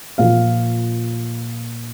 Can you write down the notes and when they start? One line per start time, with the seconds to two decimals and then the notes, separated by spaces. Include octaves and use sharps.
0.18 A#2 F3 F5